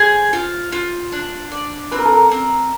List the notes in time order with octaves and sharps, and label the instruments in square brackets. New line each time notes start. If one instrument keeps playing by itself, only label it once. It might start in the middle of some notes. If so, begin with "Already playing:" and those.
Already playing: [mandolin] G#4 [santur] C5
[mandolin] F4
F4
D4
D5
[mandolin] C4 [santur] B4
[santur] A#4
A4
A#4
[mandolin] C4